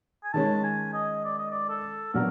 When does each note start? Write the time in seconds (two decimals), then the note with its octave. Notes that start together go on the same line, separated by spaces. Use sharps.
0.24 G#5
0.33 D#3 G#3 C#4 A5
0.64 G#5
0.93 D#5
1.24 D5
1.38 D#5
1.51 D5
1.69 A4
2.14 A#2 F#3 B3 D4 F#4 A#4